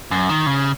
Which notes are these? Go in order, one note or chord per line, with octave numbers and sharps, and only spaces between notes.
F#2
D#3
C#3